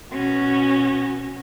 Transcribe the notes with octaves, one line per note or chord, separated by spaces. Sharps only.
B2 C#4 F#4